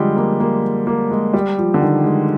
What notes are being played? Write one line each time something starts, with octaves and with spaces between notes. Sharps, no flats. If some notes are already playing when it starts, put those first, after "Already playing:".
Already playing: D3 F3 G3 G#3
A#3
A#3
A#3
G#3
G3
F3
D3
D#3
G#3